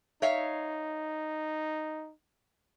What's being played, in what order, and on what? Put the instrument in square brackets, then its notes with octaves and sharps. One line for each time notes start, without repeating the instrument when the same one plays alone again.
[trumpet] D#4 [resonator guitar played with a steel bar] C#5 E5 F5